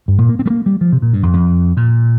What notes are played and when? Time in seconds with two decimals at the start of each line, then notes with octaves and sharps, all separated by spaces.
0.08 G2
0.18 A#2
0.29 A#3
0.39 C4
0.46 G3
0.50 A#3
0.66 G3
0.81 F3
0.93 C3
1.02 A#2
1.13 G2
1.23 F2
1.33 F2
1.77 A#2